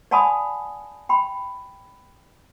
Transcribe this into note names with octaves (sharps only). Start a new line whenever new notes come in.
D5 F#5 G#5 A5 B5 D#6
G5 B5